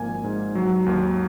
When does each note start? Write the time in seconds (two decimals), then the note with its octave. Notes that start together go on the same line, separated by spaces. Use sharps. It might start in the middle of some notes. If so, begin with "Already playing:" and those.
Already playing: G#1 F3 A#3 G#5
0.24 G#2
0.55 F#3
0.86 D#2